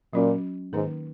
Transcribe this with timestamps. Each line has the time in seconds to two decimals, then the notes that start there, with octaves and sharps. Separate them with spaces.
0.13 A#2 F#3 C#4 F#4
0.73 G#2 D#3 A#3 D#4 A#4